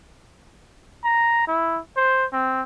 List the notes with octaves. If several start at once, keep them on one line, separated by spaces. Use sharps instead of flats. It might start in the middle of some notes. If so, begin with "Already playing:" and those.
A#5
E4
C5
C4